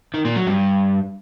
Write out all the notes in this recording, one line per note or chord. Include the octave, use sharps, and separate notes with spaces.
D#3
A#2
F#3
G2